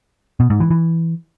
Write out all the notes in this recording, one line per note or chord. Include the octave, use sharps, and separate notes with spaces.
B2
G#2
E3
E3